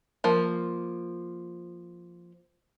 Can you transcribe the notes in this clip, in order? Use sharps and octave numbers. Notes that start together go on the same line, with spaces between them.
F3 A#3